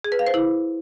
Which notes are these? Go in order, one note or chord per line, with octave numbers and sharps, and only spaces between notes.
G#4
B4
F5
C5
E4